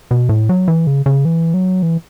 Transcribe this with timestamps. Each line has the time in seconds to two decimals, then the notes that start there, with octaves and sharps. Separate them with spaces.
0.11 B2
0.29 A2
0.49 F#3
0.68 E3
0.87 C#3
1.06 C#3
1.25 E3
1.54 F#3
1.83 E3